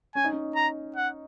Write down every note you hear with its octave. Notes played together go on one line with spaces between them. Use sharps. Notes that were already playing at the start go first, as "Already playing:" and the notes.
C#4 G#5
D#4
C#4
A#5
F#5